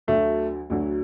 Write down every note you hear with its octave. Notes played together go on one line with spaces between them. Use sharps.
D2 D3 F#3 A3
D2 D3 F#3